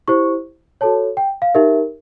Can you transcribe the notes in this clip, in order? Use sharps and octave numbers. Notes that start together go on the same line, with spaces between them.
E4 G4 C5 C#6
F#4 A4 C#5 A5
G5
F5
D#4 G4 A#4 E5